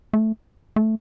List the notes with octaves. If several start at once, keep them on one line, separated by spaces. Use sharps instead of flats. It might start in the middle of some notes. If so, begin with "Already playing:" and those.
A3
A3